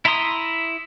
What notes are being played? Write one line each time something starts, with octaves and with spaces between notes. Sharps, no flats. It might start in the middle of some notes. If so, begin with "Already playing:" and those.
E4 E5 A#5 C6 D#6